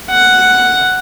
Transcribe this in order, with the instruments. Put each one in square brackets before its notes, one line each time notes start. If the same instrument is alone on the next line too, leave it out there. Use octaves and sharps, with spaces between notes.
[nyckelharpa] F#5